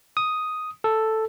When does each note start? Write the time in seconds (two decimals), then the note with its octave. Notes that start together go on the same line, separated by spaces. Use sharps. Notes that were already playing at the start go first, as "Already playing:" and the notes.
0.17 D#6
0.84 A4